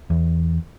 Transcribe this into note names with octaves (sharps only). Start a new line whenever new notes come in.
E2